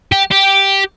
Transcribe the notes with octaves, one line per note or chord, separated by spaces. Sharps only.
G4
G4